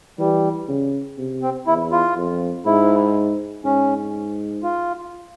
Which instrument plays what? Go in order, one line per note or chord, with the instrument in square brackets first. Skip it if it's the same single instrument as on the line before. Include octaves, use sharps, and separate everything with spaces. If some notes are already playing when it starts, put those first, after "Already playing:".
[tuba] E3 [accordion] G3
[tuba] C#3
C3
[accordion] C4
[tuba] E2 [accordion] E4
[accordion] F4
[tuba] F2
[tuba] G#2 [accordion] E4
[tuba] G#2 [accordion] C#4
[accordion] F4